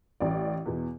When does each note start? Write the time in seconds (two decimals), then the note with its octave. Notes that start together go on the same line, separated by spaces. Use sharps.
0.20 A1 D5
0.66 E2 B2